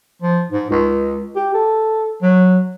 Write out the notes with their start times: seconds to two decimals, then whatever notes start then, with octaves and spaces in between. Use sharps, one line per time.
0.22 F3
0.50 G#2
0.70 C#2
1.35 G4
1.54 A4
2.22 F#3